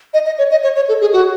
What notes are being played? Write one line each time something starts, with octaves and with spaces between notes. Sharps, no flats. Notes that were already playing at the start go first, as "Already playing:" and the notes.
D#5
D#5
C#5
D#5
C#5
C#5
A4
G#4
F#4